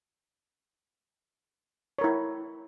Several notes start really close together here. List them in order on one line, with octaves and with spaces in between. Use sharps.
C#5 A#4 E4